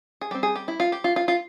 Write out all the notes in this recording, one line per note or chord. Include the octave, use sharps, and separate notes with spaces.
G#4
G3 C4 G4
G#4
G4
E4
F4
G4
F4
F4
F4